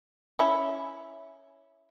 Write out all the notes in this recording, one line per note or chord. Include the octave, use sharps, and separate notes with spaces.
C#4 E4